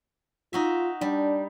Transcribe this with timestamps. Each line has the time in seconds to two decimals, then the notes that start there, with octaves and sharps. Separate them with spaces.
0.53 D#4 F4 F#4 E5
1.01 G3 D4